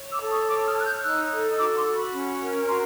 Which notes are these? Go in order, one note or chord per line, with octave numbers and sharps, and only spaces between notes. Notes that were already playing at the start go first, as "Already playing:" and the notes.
Already playing: C#5
D6 E6
A4
C#6 D#6
C#5 D6 E6
D#6 F6
C#5 F#6
F6 G6
D#4 E6 F#6
A4
F#4 D6 E6
C6 D6
F#4
B5 C#6
C#4
A#4
F#4 A#5 C6